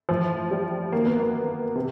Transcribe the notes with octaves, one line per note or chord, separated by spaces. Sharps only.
A2 E3 F3
G3
F#2 D#3 A#3
B3
A#3
C3